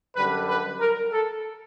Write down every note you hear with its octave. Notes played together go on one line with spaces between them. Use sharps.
F#2 D3 G3 B4
B4
A#4
A4